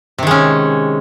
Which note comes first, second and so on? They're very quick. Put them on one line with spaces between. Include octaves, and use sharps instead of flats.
C3 D#3 G#3 C#4